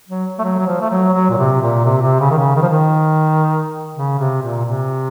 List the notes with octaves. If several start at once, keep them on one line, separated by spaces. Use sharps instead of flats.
F#3
A3
F#3
F#3
F3
A3
F#3
F#3
A#2
C3
A#2
C3
C3
C#3
D#3
C#3
D#3
F3
D#3
C#3
C3
A#2
C3